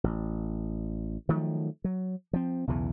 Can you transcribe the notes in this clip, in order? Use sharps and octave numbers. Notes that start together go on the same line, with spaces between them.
A1
D#3 F3 F#3 A3
F#3
F3 C4
B1 E2 C#3 E3